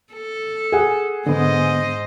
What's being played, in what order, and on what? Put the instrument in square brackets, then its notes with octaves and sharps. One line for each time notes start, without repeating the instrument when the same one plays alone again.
[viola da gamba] A4
[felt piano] G#4 F#5
[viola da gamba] G#2 C5 D#5 [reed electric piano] D3 B3